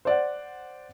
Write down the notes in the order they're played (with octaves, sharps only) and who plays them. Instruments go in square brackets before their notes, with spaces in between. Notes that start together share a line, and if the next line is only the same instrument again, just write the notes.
[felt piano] C5 D5 F#5